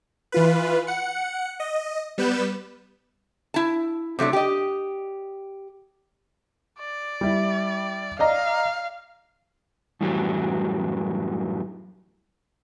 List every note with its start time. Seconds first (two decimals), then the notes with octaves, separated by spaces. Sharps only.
0.32 E3 F4 B4
0.87 F#5 C#7
1.60 D#5
2.18 G3 B3 B4 G6 E7
3.54 E4 A5
4.19 C3 F#3 A3 D4
4.33 G4 D#5
6.79 D5
7.21 G3 E4
8.19 D5 D#5 F5 A#5
10.01 F#2 A2 E3 F#3 G3